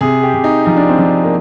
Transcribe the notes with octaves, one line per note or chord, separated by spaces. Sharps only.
C3 G#4
G4
C3
D#4
F3 D#4
D4
C4
F3 D4
A#3